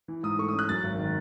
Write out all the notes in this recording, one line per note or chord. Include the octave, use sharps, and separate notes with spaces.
E3
G#2 D#6
A3 C#6
C#4 D#6
F#6
F#2 A6
G#1
D#3